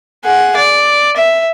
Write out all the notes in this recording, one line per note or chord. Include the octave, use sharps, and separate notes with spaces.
G#4 F#5
D5
E5